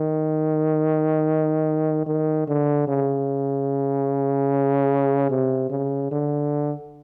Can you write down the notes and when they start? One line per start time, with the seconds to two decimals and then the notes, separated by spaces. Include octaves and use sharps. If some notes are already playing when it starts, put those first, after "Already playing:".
Already playing: D#3
2.07 D#3
2.48 D3
2.88 C#3
5.30 C3
5.70 C#3
6.11 D3